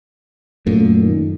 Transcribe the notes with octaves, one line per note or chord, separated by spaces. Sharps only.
F#2 A#2 A3
D#3